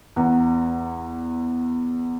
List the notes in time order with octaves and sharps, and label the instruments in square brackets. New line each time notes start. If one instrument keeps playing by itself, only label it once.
[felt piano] E2 F#5 A#5